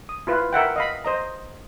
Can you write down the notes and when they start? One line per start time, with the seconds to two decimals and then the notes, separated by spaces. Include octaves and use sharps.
0.09 D#6
0.27 E4 F4 B4
0.53 A#4 E5 F#5 G5
0.76 D#5 F5 B5
1.05 C5 D#5 A#5